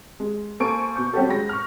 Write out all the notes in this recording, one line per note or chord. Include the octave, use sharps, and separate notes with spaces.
G#3
A#3 A4 C5 G#5 C#6 D7
B2 C#6 G6
G3 C4 C#4 F#4 G4 A4
F#3 G#3 B5 A#6
C#6 F6